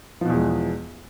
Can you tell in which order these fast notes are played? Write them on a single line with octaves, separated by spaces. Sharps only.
F3 B2 E2 G#3